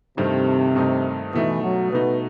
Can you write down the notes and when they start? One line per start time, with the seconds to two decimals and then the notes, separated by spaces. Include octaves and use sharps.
0.17 G2 C3 D#3 A3 C4 D#4
0.76 G2 D#3 A3 C4 D#4
1.34 B2 E3 A3 D#4
1.62 F#3
1.92 B2 A3 B3 D#4